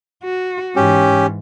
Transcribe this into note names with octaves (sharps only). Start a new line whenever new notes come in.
F#4
G#2 E3 C#4 G4